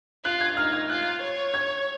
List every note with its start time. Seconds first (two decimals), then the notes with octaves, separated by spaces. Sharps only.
0.24 F4 F#6
0.41 G#6
0.57 D#4 F6
0.73 G#6
0.90 F4 F#6
1.21 C#5
1.54 G#6